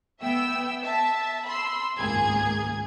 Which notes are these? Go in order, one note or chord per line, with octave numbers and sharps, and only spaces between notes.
B3 E5 G5 E6
E5 A5
B5 C6 E6
G#1 C#2 A#3 G#4 G#6